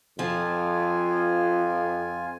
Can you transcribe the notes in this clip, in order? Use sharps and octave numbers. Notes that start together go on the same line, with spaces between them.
F2 F3 F4 G#5